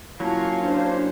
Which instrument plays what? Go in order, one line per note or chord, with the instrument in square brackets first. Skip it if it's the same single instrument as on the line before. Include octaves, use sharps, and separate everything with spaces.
[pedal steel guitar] F#3 A#3 C#4 [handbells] E4 A5 [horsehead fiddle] F4 F5 [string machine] C#6
[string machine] D4 C5